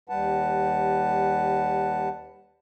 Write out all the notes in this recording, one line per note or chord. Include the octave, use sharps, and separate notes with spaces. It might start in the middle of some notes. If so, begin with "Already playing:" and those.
D#2 G3 B4 F#5 A5